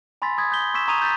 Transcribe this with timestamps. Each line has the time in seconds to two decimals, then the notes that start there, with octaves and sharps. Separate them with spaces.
0.22 G#5 B5 C6 E6 A6 B6
0.37 B5 D#6 G#6 B6
0.51 D#6 G6 B6 G7
0.74 C6 C#6 E6 B6 E7
0.88 A#5 C#6 D#6 G#6 D#7 F7
1.02 G6 A6 B6